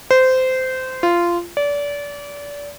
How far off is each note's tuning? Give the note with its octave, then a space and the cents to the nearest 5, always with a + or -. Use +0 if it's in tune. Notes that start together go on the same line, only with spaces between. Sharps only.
C5 -20
F4 -15
D5 -30